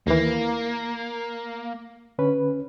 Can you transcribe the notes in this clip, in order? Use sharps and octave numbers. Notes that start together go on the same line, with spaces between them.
D#2 E3 A#3
D3 C#4 B4